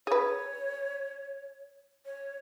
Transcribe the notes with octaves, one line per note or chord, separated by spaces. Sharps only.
G#4 B4 C#5
C#5